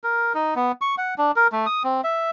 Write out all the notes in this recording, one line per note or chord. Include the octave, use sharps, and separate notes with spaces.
A#4
D#4
B3
C#6
F#5
D4
A#4
A3
D#6
C4
E5